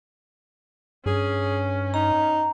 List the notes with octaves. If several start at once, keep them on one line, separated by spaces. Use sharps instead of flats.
G2 C#4 G#4
D#4 A#5